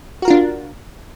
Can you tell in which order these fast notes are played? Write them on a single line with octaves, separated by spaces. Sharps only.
F#4 A#4 F4 D4